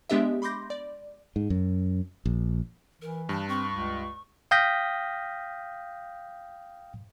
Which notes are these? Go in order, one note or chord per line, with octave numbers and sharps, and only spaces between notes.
G#3 B3 D4 G4 D#5 E5
B5 C6 D6 G6 A#6
D5
G#2
F#2
A#1
E3 A#4
G2 A5
C4 C#6
C#2
F5 G5 D#6 G6 A#6 B6